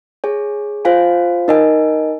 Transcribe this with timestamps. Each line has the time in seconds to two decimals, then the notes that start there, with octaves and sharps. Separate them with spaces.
0.24 G#4 C#5 G#5
0.85 F4 C5 F5 G#5
1.48 D#4 A#4 D#5 G#5